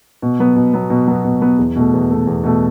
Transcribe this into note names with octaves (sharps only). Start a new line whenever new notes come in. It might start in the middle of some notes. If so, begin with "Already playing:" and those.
B2
F#3 B3
B2
F#3 B3
B2
F#3 B3
B2
F#3 B3
E2
B2 A3
E2
B2 A3
E2
B2 A3